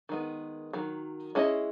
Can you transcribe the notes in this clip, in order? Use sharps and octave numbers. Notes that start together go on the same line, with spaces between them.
D#3 G#3 B3
D#3 F#3
G#3 C#4 E4 A4 D#5